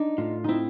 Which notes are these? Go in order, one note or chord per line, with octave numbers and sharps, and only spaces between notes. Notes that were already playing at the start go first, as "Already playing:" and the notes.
Already playing: D4 D#4
A2 F4
C4 D#4 E4